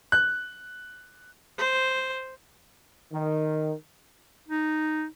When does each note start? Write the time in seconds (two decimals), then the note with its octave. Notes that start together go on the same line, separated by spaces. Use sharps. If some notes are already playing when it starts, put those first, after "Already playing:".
0.12 F#6
1.58 C5
3.13 D#3
4.49 D#4